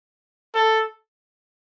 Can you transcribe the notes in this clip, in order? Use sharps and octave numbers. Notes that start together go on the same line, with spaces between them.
A4